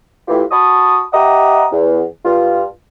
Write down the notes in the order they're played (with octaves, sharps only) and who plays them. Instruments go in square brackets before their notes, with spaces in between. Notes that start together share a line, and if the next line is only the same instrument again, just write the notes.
[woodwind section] A2 E3 F4 G4
F#4 A5 B5 C#6 D#6
G4 D#5 E5 F#5 A#5 D#6
E2
G2 F4